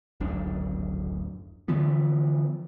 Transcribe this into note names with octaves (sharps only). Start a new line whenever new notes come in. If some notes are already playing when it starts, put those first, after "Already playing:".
D1 G#1 F#2 D4
D3 E3 F3 B3